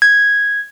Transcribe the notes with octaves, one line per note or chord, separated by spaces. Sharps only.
G#6